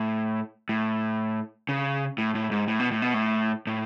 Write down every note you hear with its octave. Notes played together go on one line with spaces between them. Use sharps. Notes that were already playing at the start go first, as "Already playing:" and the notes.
Already playing: A2
A2
C#3
A2
A2
G#2
A2
B2
A2
B2
A2
A2